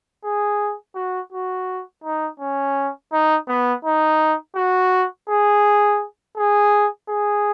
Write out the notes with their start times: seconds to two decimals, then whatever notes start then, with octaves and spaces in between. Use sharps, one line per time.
0.24 G#4
0.95 F#4
1.32 F#4
2.04 D#4
2.40 C#4
3.12 D#4
3.48 B3
3.85 D#4
4.56 F#4
5.29 G#4
6.37 G#4
7.09 G#4